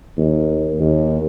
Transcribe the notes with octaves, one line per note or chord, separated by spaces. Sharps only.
D#2
D#2